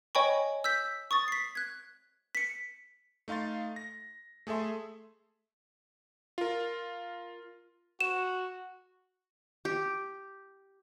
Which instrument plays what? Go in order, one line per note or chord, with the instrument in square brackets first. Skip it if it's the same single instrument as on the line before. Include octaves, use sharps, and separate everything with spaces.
[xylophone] C#5 D#5 G5 G#5 B5 C#6
E6 G6 B6
C#6 D#6 A6
B6 C7
F#6 G#6
B6 C#7
[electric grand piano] A3 D#4 F5 C6 A6
A#6
A3 G#4 A4 E5 C6
F4 A#4
[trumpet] F#4 [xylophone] E7
[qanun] G4